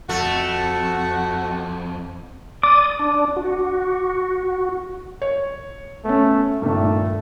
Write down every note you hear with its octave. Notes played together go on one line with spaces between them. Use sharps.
F2 A3 F#4
D5 D6 D#6
D4
F#4
C#5
A3 B3 C#4
G2 A#2 D#3 A3